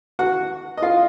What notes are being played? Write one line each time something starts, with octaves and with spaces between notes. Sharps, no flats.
F#4 F#5
D#5
F4 F5